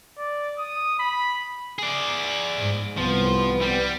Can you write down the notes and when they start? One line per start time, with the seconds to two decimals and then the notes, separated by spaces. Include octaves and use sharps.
0.18 D5
0.59 D#6
0.99 B5
1.79 G#4 D5
2.59 G#2
2.97 C2 F3 B3
3.62 G3